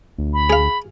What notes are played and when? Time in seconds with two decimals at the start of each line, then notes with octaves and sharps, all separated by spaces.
0.18 D2
0.33 B5
0.50 G#4 F5